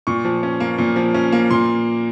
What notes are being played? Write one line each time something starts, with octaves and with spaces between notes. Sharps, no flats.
A#2 C#6
F3
C#4
A#3
A#2
F3
C#4
A#3
A#2 C6